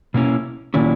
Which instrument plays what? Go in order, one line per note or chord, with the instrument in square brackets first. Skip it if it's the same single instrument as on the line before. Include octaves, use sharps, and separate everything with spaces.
[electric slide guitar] B2 A#3 C#4 E4
[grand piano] A#2 [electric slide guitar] D#3 F#3 C#4 E4